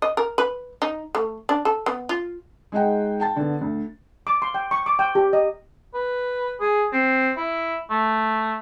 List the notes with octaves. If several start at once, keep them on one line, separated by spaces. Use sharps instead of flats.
D#5
A#4
B4
D#4
A3
D4
A4
B3
F4
G#3 D#4 D#5 F#5 G5
G5 A5 A6
D3 B3
D2
D6
C6
G5
C#6
D6
G5
G4
D#5
B4
G#4
C4
E4
A3